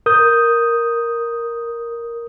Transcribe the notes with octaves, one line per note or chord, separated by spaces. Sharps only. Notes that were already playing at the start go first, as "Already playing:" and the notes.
A#4 D#6 G6